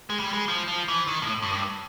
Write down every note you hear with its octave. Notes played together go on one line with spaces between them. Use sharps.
G#3
G3
G#3
F3
F3
E3
D#3
A2
F#2
G2